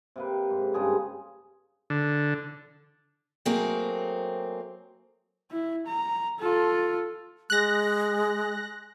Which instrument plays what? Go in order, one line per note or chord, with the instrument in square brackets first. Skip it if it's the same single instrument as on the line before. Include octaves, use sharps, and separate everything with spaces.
[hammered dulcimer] C3 A#3 B4
G#2
G2 C#3 F4 G#4
[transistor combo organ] D3
[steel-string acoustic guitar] F#3 A3 A#3 C4 G#4
[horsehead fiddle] E4
A#5
F4 A4
[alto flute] G#3 [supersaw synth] F#6 A#6